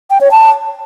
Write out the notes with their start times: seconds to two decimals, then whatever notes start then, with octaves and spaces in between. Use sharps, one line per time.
0.10 G5
0.21 C#5
0.31 A5